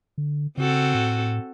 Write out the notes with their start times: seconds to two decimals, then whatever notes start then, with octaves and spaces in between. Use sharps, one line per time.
0.18 D3
0.58 C#3 C4 F#4 A4
0.94 A2